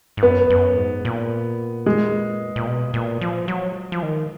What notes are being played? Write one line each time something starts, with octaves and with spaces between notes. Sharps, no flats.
G#2
F#2 B3
F#2
G#2
A#2
G#3
A#2
B2
A#2
F3
F#3
F3
D#3